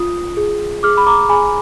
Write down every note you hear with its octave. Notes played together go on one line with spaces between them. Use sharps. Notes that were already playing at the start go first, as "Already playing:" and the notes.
Already playing: F4 D#6
G#4
G#4 D6 F6
B5
A#5 D6
G#4 G#5 B5